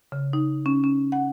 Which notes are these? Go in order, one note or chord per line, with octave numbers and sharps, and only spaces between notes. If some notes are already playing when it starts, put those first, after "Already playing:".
C#3
D#4
C#4
C#4
F#5